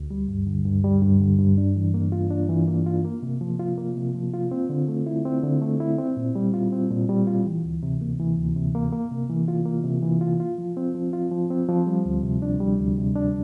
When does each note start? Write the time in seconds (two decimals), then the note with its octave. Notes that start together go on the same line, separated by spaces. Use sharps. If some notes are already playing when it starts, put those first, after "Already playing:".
Already playing: D2
0.11 G3
0.28 G2
0.47 D3
0.66 G2
0.84 G3
1.02 G2
1.20 D3
1.39 G2
1.58 D4
1.76 E3
1.94 A#3
2.12 F4
2.31 D4
2.49 E3
2.68 A#3
2.86 F4
3.04 A#3
3.23 C3
3.41 F3
3.59 F4
3.78 A#3
3.97 C3
4.15 F3
4.34 F4
4.51 C4
4.70 D3
4.88 A3
5.06 E4
5.25 C4
5.43 D3
5.62 A3
5.80 E4
5.99 C4
6.17 A#2
6.35 G3
6.54 F4
6.72 C4
6.90 A#2
7.09 G3
7.27 F4
7.45 E3
7.64 D2
7.83 C3
8.01 A#3
8.19 E3
8.38 D2
8.56 C3
8.75 A#3
8.93 A#3
9.11 C3
9.30 E3
9.48 F4
9.66 A#3
9.84 C3
10.03 E3
10.21 F4
10.40 F4
10.58 F3
10.77 C4
10.95 F3
11.13 F4
11.31 F3
11.50 C4
11.69 F3
11.87 G3
12.06 D2
12.24 C3
12.42 D4
12.60 G3
12.79 D2
12.97 C3
13.16 D4